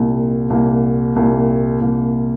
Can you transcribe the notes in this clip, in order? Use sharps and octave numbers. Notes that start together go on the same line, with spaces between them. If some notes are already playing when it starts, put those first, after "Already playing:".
Already playing: C2 A#2 A#3
C2 A#2 A#3
C2 A#2 A#3
C2 A#2 A#3